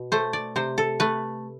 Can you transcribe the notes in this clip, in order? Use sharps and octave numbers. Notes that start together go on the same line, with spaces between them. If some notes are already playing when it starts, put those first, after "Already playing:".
Already playing: B2
A3 C5
D5
C3 C5
A4
A3 B4